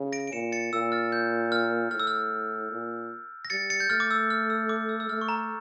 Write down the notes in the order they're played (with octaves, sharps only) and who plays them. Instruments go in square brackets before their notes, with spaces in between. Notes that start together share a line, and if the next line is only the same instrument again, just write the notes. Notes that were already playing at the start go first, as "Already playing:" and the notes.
Already playing: [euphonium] C#3
[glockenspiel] A#6 D7
D7
[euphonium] A#2 [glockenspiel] C#7 E7
[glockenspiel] A6 C#7
[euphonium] A#2 [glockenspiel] E6
[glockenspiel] F6 A6
G6
F6
[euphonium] A2 [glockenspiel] F6
[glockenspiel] E6
F6
[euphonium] A#2
[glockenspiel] A#6
[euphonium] G3 [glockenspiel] A6 C#7
[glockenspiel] A6 C#7
G6
[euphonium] A3 [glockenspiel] F6 A6
[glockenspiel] D6
E6
F6
E6
D6
E6
E6
[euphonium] A3 [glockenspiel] F6
[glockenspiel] C#6
A#5